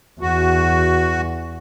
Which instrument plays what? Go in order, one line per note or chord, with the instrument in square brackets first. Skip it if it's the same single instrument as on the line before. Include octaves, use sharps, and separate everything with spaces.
[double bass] E2 [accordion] F#4